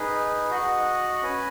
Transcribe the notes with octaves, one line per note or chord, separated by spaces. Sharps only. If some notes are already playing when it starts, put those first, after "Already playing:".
Already playing: D#4 G#4 B4
F#4 D#5 F#5
C#4 B4 G#5